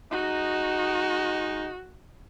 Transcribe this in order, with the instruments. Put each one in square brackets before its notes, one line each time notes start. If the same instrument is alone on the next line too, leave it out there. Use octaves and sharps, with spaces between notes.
[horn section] G#3 D#4 [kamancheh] F#4